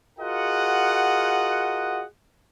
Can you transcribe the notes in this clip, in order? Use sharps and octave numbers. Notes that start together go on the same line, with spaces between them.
F4 F#4 G#4 A#4 D#5 F#5